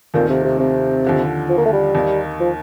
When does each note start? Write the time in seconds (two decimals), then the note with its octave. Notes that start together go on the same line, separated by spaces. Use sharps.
0.14 D#2 A#2 D#3 A3 C4 F4
0.29 C3
0.44 C3
0.60 C3
1.04 D#2 D3 F3
1.49 F3
1.58 A#3
1.66 A3
1.73 G3
1.95 D#2 D#3 A#3
2.40 F3